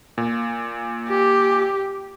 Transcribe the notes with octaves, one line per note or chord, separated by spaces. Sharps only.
A#2
G4